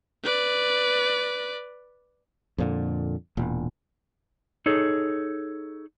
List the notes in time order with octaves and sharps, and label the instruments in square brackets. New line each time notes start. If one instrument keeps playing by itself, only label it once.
[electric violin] B4 D5
[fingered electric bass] F2 A#2 D3
E1 A#2
[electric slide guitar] D#4 G#4 A4 C#5